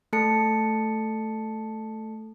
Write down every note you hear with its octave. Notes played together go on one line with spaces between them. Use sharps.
A3 A4 A5 C#7